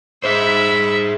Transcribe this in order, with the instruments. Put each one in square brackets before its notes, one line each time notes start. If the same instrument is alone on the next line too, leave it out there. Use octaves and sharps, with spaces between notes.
[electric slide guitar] G#4 C5 [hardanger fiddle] E5 B5